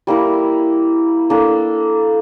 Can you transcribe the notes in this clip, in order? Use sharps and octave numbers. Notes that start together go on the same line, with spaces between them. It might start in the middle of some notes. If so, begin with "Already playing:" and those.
G3 A#3 E4 A#4
A#3 D4 A4